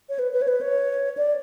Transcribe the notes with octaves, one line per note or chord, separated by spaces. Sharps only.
C#5
B4
B4
C#5
B4
C#5
D5